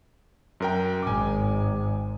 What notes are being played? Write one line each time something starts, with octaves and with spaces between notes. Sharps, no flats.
F#2 A#4 G5
G#1 G#2 G#5 D6